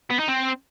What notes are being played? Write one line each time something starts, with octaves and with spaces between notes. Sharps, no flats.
B3
D#4
C4